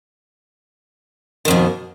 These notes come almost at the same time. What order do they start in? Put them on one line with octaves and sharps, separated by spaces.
D#3 F2 B2